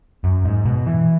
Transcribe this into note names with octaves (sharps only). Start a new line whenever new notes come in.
F#2
G#2
B2
E3